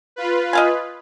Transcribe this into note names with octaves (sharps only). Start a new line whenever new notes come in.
F4 B4
D#5 F5 G#5